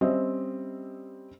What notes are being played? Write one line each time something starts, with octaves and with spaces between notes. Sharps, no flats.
G3 C4 C#4 C5 D#5 E5